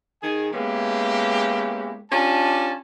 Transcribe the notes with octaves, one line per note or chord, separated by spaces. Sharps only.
D#3 G#4 G#5
G#3 A#3 B3 C#4 E4 G4
C#4 D4 F4 G4 A5